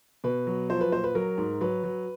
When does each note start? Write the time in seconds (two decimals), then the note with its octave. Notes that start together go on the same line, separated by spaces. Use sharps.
0.24 B2 B4
0.47 F#3
0.70 F3 C5
0.81 B4
0.92 A#2 C5
1.04 B4
1.15 F#3 A#4
1.38 G#2
1.61 F#3 B4
1.84 F#3